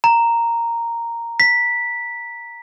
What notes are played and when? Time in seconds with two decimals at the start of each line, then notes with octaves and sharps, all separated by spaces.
0.04 A#5
1.40 B6